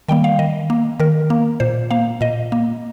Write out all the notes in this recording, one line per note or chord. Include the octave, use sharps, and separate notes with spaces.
D#3 G3 A#3 G5
F5
D#3 D#5
A#3
D#3 A#4
A#3
A#2 C5
A#3 F5
A#2 D#5
A#3